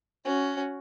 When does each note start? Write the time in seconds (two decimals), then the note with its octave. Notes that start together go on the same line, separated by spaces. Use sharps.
0.25 C#4 F#4